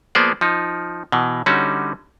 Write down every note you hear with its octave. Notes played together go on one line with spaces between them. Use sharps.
F3 A#3 B3 G#4 C5 D5
F3 D#4
B2 E3
D3 G3 C#4 D#4 F#4